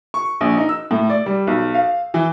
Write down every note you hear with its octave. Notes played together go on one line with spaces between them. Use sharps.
C#6
A#1
D#4
E6
A2
D5
G3
B1
F5
E3